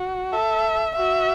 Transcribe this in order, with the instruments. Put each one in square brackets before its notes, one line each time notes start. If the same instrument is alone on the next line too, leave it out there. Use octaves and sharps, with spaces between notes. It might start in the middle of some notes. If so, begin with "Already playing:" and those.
Already playing: [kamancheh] F#4
[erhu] A4 [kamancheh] E5
[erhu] F#4 [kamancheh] E5